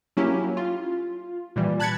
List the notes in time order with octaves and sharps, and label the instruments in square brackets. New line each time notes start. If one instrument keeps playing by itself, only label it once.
[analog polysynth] F#3 A#3 C#4 E4 G4
F4
A#2 E3 G3
A5 B5 F#6 G#6 A6 C#7